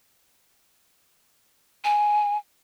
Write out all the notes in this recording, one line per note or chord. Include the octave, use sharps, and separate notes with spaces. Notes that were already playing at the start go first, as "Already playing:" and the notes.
G#5